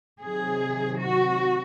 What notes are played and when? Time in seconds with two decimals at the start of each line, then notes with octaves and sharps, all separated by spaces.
0.22 C3 D#3 F#3 G#4
1.00 F#4